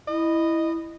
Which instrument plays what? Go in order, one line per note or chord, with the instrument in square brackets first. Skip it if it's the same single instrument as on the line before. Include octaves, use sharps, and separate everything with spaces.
[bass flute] E4 [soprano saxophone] D#5